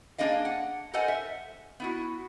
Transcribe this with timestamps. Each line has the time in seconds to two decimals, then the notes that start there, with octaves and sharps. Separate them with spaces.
0.18 A#3 D4 G#4 D#5 F5
0.45 F#5
0.93 A4 A#4 C5 D#5 F#5 G#5
1.08 E5
1.80 B3 E4 F#4